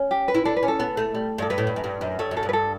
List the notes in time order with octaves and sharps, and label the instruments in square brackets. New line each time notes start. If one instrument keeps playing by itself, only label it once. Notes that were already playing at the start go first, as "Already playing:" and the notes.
Already playing: [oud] C#4
[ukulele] G4
B4
[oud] E4
[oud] D4 [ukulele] A4
[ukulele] B4
[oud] C#4
[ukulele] A4
[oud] B3
A3
G3
G2
[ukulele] A4
[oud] G2 [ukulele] B4
[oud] A2
G2
F#2
G2
F#2
[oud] G2 [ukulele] A4 C#5
[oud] F#2
[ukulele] A4
[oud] G2
[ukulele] B4
A4